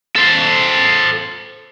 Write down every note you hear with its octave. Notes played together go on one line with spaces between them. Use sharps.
A4 C5